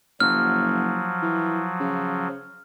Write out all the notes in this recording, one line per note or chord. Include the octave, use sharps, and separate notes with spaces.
F#1 F3 F#3 F6
E3
C#3